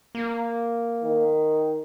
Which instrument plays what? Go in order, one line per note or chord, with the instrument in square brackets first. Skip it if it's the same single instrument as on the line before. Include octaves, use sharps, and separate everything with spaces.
[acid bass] A#3
[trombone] D#3